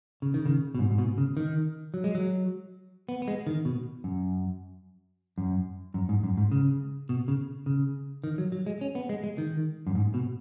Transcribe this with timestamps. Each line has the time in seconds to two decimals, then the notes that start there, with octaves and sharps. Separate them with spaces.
0.22 C#3
0.34 D#3
0.46 C#3
0.75 B2
0.79 G#2
0.91 G#2
0.98 B2
1.18 C#3
1.37 D#3
1.94 F#3
2.04 G#3
2.15 F#3
3.09 B3
3.22 B3
3.28 G#3
3.47 D#3
3.65 B2
4.04 F#2
5.38 F#2
5.94 F#2
6.09 G#2
6.23 F#2
6.38 G#2
6.52 C#3
7.09 B2
7.28 C#3
7.66 C#3
8.24 D#3
8.38 F#3
8.52 F#3
8.66 G#3
8.81 C#4
8.95 B3
9.09 G#3
9.24 G#3
9.38 D#3
9.87 F#2
9.95 G#2
10.14 B2